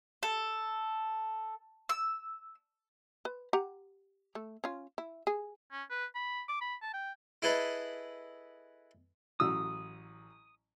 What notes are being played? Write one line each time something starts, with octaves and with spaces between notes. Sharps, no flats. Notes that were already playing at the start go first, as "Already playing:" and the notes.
A4
E6
B4
G4 F#5 A#5
A3
C#4 F4
E4
G#4
C#4
B4
B5
D6
B5
A5
G5
E4 G#4 A4 B4 D#5
A1 F#3 D#6 E6